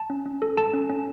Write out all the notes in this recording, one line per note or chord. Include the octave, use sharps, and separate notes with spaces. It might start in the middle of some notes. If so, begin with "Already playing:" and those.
Already playing: A5
C#4
C#4
A4
A4 A5
C#4
C#4